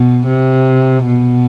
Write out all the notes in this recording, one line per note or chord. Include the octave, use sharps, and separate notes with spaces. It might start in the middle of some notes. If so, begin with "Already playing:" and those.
Already playing: B2
C3
B2